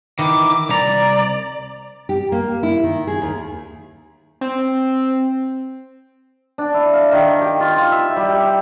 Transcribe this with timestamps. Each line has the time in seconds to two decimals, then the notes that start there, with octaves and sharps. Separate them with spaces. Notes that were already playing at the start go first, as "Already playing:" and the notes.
0.19 D#3 E3 D6
0.69 C2 D5 A#5
2.09 G4
2.32 A#3
2.63 E4
2.84 D#3
3.07 G#4
3.22 D#2
4.41 C4
6.58 D4
6.74 E4
6.93 F5
7.12 D#3
7.41 G4
7.60 F4
7.76 F4
7.92 E5
8.16 G3
8.29 G4